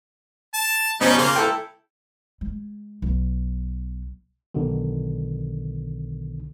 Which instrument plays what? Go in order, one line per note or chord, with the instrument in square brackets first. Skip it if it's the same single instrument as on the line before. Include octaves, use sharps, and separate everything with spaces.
[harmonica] A5
[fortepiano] B2 F3 C#4 [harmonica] G3 D#4
[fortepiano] C#3 [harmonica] A#3 F4
[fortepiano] E4 A4 G5
[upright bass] G#3
B1
[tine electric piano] B1 B2 D3 D#3